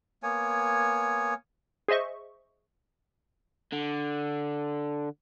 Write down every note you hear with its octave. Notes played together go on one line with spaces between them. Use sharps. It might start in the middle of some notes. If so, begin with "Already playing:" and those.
A#3 B3 C#5 G#5
G#4 C5 D#5 E5 C#6
D3